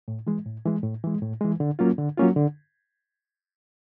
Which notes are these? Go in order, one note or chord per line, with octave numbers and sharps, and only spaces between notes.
A2
E3 G#3
A2
E3 G#3
A2
E3 G#3
A2
E3 G#3
D3
F#3 A#3 C#4 F4
D3
F#3 A#3 C#4 F4
D3